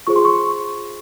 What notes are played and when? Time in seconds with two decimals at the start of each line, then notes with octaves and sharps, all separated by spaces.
0.07 F4 G#4 C5 C#6
0.16 C6
0.25 C#6